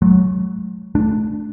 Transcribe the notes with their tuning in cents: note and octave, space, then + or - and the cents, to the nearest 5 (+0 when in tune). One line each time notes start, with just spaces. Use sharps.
F#3 +0 A3 -45
A3 -20 D4 +0